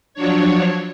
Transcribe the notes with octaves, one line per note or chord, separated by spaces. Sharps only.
F3 F#3 D4 C#5